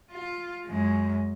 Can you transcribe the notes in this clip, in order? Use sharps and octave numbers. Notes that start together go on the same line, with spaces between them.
F4
F#2 G#3